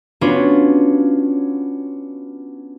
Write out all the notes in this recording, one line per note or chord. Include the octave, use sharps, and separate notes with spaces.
B3 C#4 D4 F4 F#4